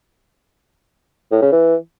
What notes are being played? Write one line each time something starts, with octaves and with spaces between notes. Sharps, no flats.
A2
C#3
E3